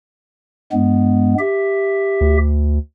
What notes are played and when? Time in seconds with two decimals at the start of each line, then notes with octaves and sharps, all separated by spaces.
0.72 G2 G#3 B3
1.39 G4 E5
2.21 D2